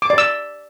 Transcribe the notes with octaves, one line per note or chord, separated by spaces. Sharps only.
D6
D5
E6